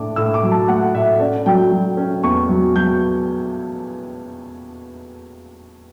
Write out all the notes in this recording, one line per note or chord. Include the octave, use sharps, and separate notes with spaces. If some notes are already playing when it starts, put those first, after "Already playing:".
Already playing: A2 D4 D6
A2 E6
D6
F#3
A5
A3 F#5
A2 E5
C#4 D5
F#3 G5
F#3
C#4
E2 C#6
F#3
F#3 G6